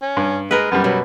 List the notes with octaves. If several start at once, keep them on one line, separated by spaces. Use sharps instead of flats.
C#4
G2
G#3 A#4 B4
F#2 G3 B3
B2 F#3